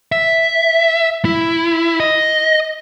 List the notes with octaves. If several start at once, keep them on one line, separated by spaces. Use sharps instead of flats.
E5
E4
D#5